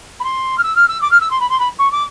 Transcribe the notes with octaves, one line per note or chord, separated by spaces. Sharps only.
B5
C6
F6
E6
F6
E6
D6
F6
E6
C6
B5
C6
B5
C#6
D6